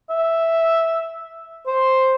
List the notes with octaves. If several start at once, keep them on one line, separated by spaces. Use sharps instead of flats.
E5
C5